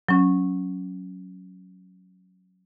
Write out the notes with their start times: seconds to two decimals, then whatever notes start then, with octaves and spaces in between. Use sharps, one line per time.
0.09 F#3 C#4